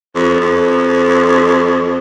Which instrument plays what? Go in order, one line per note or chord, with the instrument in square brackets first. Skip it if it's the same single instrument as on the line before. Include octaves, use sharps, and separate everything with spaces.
[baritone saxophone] F2
F2